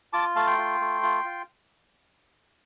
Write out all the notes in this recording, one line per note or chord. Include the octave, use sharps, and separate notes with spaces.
F4 A5 D6
A3 F5 A5
G5 C6
F4
A3
F4
F4